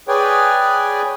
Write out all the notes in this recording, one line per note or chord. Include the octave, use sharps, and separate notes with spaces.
G#4 B4 C#5 D5 G5 G#5